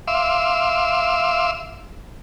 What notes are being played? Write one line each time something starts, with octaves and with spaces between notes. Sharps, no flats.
E5 F5 C6 D6 E6